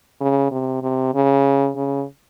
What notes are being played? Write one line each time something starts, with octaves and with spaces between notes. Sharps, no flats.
C#3
C3
C3
C#3
C#3